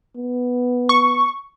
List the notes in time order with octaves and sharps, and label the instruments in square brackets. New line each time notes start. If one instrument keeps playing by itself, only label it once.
[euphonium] B3
[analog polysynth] C#6